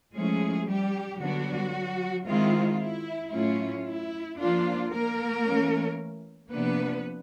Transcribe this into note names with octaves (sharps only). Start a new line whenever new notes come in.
F3 G#3 A3 C#4 E4 G#4
G3 G4
D3 F#3 G3 B3 D4 F#4
D#3 G#3 C4 E4 F4
E4
A2 F#3 A3 C#4 E4 F4
E4
F3 A#3 D4 F4
A#3 A#4
E3 A3 C#4
C3 F3 A#3 B3 D4 B4